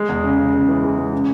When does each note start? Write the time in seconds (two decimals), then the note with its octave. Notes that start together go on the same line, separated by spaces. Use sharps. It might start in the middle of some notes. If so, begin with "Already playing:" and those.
Already playing: G#3
0.09 E2
0.24 C#3
0.39 C#3
0.53 C#3
0.68 E3
0.83 G#3
0.98 G#3
1.13 C#3